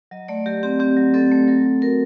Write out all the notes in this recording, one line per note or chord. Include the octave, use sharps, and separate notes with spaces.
F#3 D#5
A3 D5
F#3 G4
C4 G4
C4 G4
F#3
C4 A4
A3
F#3 A4
F#3
F#4 A#4